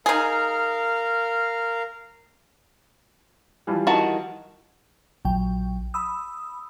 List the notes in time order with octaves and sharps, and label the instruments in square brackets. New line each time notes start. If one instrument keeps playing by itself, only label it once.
[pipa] D#4 G#4 [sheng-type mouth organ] A#4 F5
[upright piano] E3 F3 G3
[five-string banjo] D#3 F#4 A5
[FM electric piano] A#1 F#3 G5
B5 D#6 E6